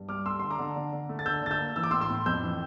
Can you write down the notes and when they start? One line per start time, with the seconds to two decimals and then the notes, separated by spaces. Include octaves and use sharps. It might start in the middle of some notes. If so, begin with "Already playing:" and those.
Already playing: G2
0.09 G3 D6 F6
0.26 A3 C6 E6
0.40 D3 C6
0.50 A#5 D6
0.59 D3
0.76 D3
0.93 D3
1.09 A3
1.19 A6
1.26 D3 E6 G6
1.43 D3 A6
1.51 E6 G6
1.59 A#3
1.76 E3 E6
1.83 D6
1.91 A2 C6 E6
2.01 C6 E6
2.09 A2
2.26 F2 E6 G6
2.43 E3